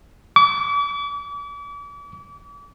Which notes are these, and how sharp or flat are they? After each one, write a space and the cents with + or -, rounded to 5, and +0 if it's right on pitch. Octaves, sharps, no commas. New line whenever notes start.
D6 -40